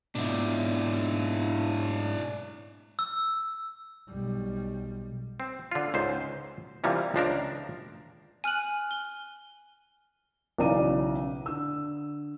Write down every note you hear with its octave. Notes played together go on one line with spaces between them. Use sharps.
G#2 B2 D4 E4
E6
B1 G3
C4
D3 F4
C#2 G#2 C5
C3 E3 F3 G3 A#3
C#2 F3 D4 A#4
G#5 F6 F#6 F#7
G7
B1 C#3 E3 D5 A#5 D#7
D3 E6